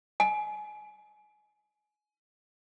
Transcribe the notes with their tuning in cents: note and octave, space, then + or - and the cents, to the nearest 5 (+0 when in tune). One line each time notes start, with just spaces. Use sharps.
G#5 +25